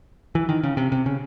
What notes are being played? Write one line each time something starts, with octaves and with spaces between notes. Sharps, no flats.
E3
D#3
C#3
C3
C3
C#3